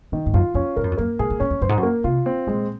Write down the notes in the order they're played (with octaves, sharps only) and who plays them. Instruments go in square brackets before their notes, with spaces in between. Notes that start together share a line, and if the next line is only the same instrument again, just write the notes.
[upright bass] A#2 [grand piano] D#3
[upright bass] G#2
[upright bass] F#2 [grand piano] F4
[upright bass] F2 [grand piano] C#4
[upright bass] G#2 [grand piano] A#4
[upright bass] F#2
F2
[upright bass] F#2 [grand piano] A#3
[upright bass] G#2 [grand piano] G#4
[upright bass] G#2
[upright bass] F#2 [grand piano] C#4
[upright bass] F2
[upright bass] F#2 [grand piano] C5
[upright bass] G#2
F#2
[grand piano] A#3
[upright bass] C3 [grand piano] F4
[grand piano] C4
[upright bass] A#2 [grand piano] G#3